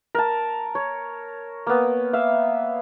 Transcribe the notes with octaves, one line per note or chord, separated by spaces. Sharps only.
A#4 A5
C#5
A#3 B3
E5 F5